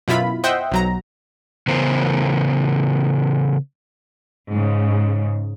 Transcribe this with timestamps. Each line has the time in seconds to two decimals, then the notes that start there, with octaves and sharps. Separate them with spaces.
0.08 F#2 B2 E4 F4 B5
0.44 C5 D#5 E5 F#5 G5
0.72 B1 F#3 A#5
1.67 C#3 E3 B3 A#4 C5
4.51 G#2 C#3